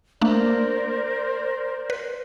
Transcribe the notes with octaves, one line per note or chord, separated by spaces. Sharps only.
A3 A#3 D4 A#4 C5 D5
B4